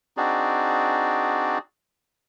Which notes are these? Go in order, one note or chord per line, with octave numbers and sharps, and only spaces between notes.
C4 D4 D#4 F#4 G#4 D5